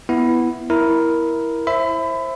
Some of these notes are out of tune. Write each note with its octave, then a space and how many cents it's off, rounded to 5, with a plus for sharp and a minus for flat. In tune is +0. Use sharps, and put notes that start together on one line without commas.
B3 +0 E4 +0
E4 +0 A#4 +10
C5 +25 E5 +0 B5 +30